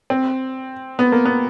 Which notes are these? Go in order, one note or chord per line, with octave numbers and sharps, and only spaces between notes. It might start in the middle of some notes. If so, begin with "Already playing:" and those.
C4
B3
A#3
B3